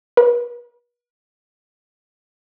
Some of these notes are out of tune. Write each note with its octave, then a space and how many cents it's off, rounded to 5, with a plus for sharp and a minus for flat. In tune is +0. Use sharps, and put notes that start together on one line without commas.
B4 -45